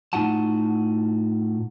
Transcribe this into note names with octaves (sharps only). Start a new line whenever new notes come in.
A2 D#4 F4 F#4 F#5 A5